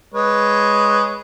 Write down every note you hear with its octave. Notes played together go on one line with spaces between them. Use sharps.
G#3 B4 C#5